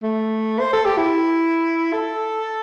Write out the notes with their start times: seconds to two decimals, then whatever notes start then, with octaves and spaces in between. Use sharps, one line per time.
0.03 A3
0.60 C5
0.73 A4
0.85 G4
0.98 E4
1.93 A4